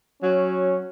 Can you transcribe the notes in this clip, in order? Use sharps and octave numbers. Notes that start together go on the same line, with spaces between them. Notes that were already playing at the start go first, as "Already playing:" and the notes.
F#3 C#4